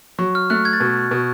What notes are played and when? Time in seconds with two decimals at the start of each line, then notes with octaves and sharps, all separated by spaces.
0.19 F#3 C#6
0.35 F6
0.50 A3 F#6
0.65 G#6
0.73 A6
0.80 B2 G#6
1.11 B2